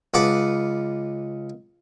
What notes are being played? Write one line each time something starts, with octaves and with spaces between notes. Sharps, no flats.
C#2 B4 F#5 A5 D6